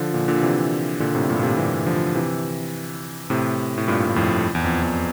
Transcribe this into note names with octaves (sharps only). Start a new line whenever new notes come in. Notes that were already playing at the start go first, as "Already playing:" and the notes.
Already playing: D3 F3
A#2 D3
A#2 D3
C3 E3
A#2 D3
A2 C3
G2 A#2
A#2
A2 C3
C3 E3
D3 F3
C3 E3
A2 C3
A2
G2 A#2
G2
F2 A2
E2
F2
E2